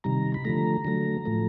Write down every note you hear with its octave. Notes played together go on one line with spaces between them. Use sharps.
C3 D#3 G3 A#5
B5
D3 F3 A3 A#5
D3 F#3 A3
A2 F3 A3